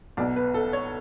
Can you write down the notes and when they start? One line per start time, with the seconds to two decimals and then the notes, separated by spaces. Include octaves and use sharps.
0.17 B1 B2 D5
0.36 B4
0.54 A4
0.73 C#5